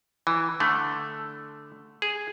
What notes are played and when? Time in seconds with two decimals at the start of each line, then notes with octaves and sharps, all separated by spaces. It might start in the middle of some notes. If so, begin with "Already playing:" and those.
0.27 E3
0.60 D3 A3
2.02 G#4